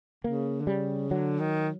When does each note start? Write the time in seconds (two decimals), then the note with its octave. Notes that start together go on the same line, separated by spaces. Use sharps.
0.24 C#3 A#3
0.60 D3
0.67 C#3 G3
1.11 D3 F#3
1.39 D#3